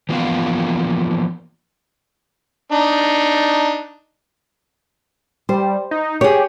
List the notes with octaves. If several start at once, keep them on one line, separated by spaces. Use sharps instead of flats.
E3 F3 A#3 B3 F5
D4 D#4
G3 C5
D#4
G4 G#4 C#5